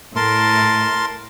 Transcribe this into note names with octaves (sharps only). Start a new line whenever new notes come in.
A2 A#4 A5 C6